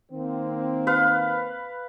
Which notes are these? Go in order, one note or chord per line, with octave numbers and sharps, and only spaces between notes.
D#3 A#3 C4
B4 F5